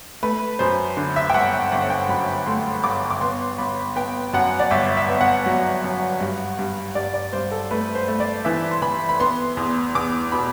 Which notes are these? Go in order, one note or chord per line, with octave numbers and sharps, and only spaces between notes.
A3 B4
F#2 C5
D3
E5
G5
G1 F#5
E5
G1 F#5
G5
F#2 B5
A3 C6
G1 D6
D6
B3 C6
G1 B5
B3 G5
F#2 F#5
D5
G1 E5
E5
B3
F#5
F#3
F#2
G2
G2
G2 D5
D5
G2 C5
A4
A3 B4
C5
A3
D5
E3 E5
C6
E3 B5
B5
B3 C6
E2
E2 D6
B2 B5